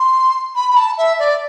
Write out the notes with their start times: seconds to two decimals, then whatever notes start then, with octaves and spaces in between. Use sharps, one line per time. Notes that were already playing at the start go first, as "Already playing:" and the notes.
Already playing: C6
0.56 B5
0.71 B5
0.77 A5
0.98 E5
1.19 D5